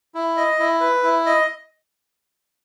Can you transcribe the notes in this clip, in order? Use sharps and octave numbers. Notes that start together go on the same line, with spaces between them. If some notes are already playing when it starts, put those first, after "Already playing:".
E4
D#5
E4
B4
E4
D#5